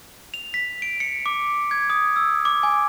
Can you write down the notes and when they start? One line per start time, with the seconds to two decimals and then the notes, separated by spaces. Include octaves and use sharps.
0.34 F7
0.54 B6
0.82 D7
1.00 C#7
1.26 D6
1.71 G#6
1.90 D#6
2.16 E6
2.45 D6
2.63 G#5